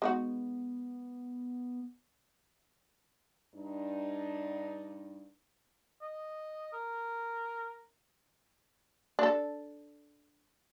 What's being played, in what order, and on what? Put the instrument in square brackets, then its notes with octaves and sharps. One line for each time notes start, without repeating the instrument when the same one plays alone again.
[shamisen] G#3 D#4 F#4 [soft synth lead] B3
[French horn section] G2 D4 D#4
[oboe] D#5
A#4
[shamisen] D4 A4